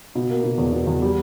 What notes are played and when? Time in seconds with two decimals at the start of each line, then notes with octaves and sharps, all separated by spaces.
0.15 B2
0.30 A#3
0.44 B2
0.58 E2
0.73 B2
0.87 E2
1.02 G3